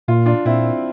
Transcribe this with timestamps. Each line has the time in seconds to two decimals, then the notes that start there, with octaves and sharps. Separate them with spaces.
0.08 A#2 F4
0.26 D4 F4
0.45 A#2 C4 E4